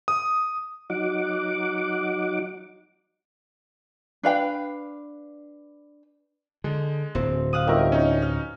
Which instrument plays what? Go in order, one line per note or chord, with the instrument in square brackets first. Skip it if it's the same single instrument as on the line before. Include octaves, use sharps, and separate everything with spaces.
[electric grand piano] D#6
[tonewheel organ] F#3 D#4 F#5 D6
[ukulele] D4 B4 F5 G5
[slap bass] D3 [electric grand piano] G#3
[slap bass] D1 [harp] C4
[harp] F5 F#5 D#6
[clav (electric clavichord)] G1 D#3 E5 [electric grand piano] G4 A#4
[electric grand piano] C#4 D#4
[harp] F6